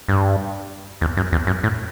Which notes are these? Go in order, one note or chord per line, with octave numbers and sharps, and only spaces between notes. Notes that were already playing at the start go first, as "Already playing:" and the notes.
G2
E2
F#2
E2
F#2
A2